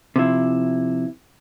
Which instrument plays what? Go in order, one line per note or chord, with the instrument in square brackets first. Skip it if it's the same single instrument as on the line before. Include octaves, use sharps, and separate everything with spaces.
[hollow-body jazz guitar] C3 F3 E4